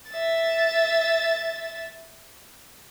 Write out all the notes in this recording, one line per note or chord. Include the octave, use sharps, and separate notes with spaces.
E5 A6